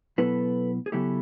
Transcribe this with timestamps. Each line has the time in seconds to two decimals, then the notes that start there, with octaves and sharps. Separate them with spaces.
0.18 B2 F#3 B3 E4 A4 B4
0.86 G#4
0.92 C#3 F#3 B3 E4 G4 A4